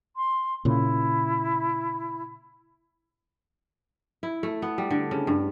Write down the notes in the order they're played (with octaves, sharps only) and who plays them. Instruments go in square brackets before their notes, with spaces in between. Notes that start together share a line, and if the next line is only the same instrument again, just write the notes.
[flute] C6
[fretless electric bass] A#2 C#3 [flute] E4
[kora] E4
A3
B3
G3
D3
C#3
G2